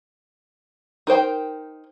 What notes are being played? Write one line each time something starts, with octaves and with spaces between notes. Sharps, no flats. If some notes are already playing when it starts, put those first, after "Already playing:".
D#4 A#4 C5 G5